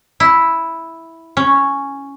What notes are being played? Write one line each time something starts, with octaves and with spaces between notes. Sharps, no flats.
E4
C#4